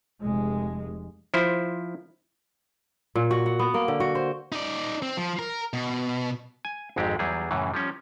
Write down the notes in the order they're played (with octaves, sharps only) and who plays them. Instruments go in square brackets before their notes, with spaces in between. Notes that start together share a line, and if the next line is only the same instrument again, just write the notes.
[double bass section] F1 G#3
[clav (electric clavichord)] F3 E4 C5
[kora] A#2
F#4
F#5
B3
A#3
D3
F#4
C5
[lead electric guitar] D#4 D5
C4
F3
A#4
B2
[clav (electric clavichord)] G#5
G#1 F2 G#2 G#3 C4 G4
E2 F#3 G3 G#4
F#2 A2 C#3 E3
F3 G3 C#4